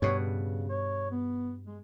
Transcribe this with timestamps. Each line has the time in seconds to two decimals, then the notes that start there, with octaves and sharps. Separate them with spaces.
0.02 G2 B2 C#5
0.19 C#3
0.69 C#5
1.11 B3
1.66 G#3